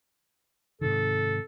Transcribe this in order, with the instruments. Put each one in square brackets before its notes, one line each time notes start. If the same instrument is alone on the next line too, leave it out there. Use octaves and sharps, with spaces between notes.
[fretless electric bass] G#2 C3 D#3 [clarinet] A4